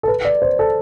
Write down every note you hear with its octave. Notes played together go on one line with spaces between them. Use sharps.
A4
B4
D5
C5
A4